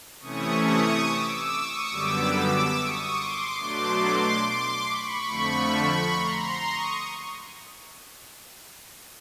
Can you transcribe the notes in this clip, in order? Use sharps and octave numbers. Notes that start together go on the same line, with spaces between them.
C3 E3 A3 C#4 E4 C#6 D#6
C#6 D#6
D6 E6
D6 E6
C#6 D#6
F#2 D3 G3 B3 D6 E6
D6 E6
C#6 D#6
C6 D6
B2 F#3 A3 D4 C6 D6
C6 D6
B5 C#6
F2 D3 F3 A3
A#5 C6
A#5 C6
C#6 D#6